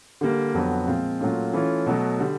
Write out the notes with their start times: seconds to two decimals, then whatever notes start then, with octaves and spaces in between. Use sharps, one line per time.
0.21 D3 G3 A#3
0.54 F2 D3 F#3 B3
0.87 A#2 F3 G#3 C4 F4
1.20 A#2 F#3 A3 C#4 F4
1.53 E3 A3 C#4 F4
1.86 B2 F#3 A3
2.19 D3 G3